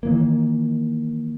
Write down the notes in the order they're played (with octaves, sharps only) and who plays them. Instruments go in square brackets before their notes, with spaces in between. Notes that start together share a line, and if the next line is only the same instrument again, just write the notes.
[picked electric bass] D#3 E3 A#3